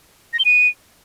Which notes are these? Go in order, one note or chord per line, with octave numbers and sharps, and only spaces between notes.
A#6
G7
D#7